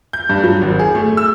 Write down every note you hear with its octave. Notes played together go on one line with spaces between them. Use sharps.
G6
G2
F#3
G#1
G#4
A3
E6